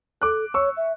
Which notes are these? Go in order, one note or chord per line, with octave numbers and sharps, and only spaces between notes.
A4 D6 F#6
C#5 C#6 E6
E5